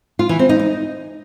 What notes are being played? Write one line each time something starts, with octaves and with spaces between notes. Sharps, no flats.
F4
E3
C4
D#4
D#4